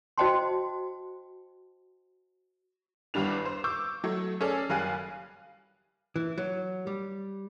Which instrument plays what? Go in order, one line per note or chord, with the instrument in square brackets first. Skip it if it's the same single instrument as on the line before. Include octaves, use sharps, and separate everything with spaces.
[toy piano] F#4 C5 D#5 G5 A5 C6
[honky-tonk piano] G1 E2 G2 G3 D4 F7
C5
C#6 D6 E6 G6
F#3 A3
C#4 G#4 A4 D5
F#1 G3 F5 G#5 F#6 D#7
[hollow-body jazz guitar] E3
F#3
G3